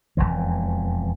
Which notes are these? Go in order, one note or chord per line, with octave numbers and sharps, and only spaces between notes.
E1 A1 F2 E3